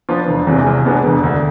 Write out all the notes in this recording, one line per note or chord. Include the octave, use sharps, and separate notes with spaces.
F3 B3 D4 F4
E1
E2 C3 E3 G#3
C2
B2 G#3 B3 D4
E1
D2 D3